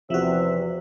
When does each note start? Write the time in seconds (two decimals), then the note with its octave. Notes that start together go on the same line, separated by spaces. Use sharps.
0.10 E2 C3 F3 F#4 E5